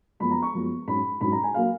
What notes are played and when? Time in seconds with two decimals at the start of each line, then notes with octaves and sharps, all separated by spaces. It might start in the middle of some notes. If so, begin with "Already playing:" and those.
0.20 F#2 F3 G#3 B3 B5
0.31 A#5
0.42 C#6
0.54 F#2 F3 G#3 B3
0.87 G#2 F#3 C#4 B5
1.21 G#2 F#3 C#4 B5
1.32 A#5
1.44 G#5
1.54 F#3 A#3 F5